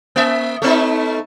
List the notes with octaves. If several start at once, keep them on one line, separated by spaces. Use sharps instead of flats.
A#3 E5
A3 B3 D#4